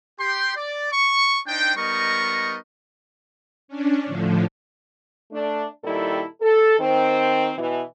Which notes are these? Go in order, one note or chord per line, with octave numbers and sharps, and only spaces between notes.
G4 G5 C6
D5
C#6
D4 D#4 C5 G5
G3 B3 D#4 A#4 D#5 C#6
C#4 D4
A2 D3 F3
A3 D4
A#2 D#3 G3 E4 A4
A4
D#3 C4
B2 E3